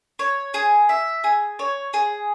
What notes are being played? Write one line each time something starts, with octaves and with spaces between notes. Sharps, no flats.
C#5
G#4
E5
G#4
C#5
G#4